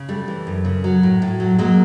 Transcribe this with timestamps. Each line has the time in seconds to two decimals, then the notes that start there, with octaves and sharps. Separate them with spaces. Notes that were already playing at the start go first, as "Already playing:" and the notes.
Already playing: C#3
0.08 G3 A3
0.28 E3
0.47 F#2
0.65 C#3
0.84 F#3
1.03 A2
1.22 A2
1.40 F#3
1.59 F#3 G#3 A#3